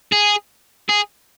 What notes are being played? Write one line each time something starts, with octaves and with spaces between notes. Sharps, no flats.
G#4
G#4